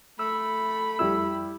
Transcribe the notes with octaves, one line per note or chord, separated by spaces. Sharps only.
A3 B5 E6
F2 G3 E4 E6